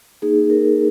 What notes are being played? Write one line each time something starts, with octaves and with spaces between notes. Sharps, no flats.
A#3 D#4 G#4
A#4